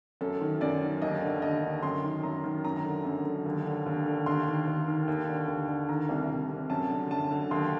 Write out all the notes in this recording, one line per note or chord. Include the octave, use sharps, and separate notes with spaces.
F#2 A4
D#3
F#2 D5
D#3
D#2 D#5
D3
D#2 D#5
D3
F#2 C6
D#3
F#2 A#5
D#3
F#2 A#5
D3
F#2
D3
D#2
D3
D#2
D3
D#2 C6
D#3
D#2
D#3
D#2
D3
D#2
D3
D#3 A#5
C2
C2
C3
F#2 A5
D3
F#2 A5
D3
D#2 C6